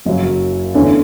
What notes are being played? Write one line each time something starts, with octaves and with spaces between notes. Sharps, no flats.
F#1 F#2 C#3 F#3
E2 D3 A3 C#4